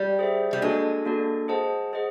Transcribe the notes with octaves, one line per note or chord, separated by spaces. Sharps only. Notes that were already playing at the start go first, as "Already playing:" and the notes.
Already playing: G3
G#4 C5 E5
G3
G#3 A#3 D4 F#4 A4 D5
A#3 D4 F#4 A4 D5
G#4 C5 D#5 F#5 A5
G#4 C5 D#5 F#5